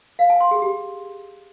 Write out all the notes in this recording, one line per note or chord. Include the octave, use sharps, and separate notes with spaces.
F5
G#5
C6
G#4
G4